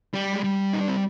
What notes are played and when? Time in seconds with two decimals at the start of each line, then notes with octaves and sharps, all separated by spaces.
0.14 G3
0.33 G#3
0.44 G3
0.73 D#4
0.81 D4
0.88 C4